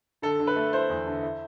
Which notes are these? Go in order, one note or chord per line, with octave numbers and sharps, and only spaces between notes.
D3 A4
D3
B4
A3
E4 C5
E2
D3
E4